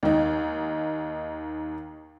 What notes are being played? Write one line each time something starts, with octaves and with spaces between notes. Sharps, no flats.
D#2 D#4